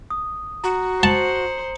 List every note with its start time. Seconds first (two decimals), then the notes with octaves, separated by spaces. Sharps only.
0.10 D#6
0.64 F#4 A#5
1.03 C5 A5 C#7 F#7